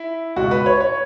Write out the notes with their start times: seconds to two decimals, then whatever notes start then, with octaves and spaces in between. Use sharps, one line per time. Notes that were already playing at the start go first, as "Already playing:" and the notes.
Already playing: E4
0.36 C#2 B2 G#3 F#4
0.51 B4
0.66 C#5
0.81 C#5